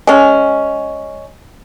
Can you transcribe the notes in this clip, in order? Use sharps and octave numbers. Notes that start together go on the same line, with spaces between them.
G#3 C#4